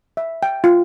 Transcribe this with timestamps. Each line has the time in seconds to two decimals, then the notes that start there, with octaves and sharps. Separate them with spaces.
0.17 E5
0.43 G5
0.64 F4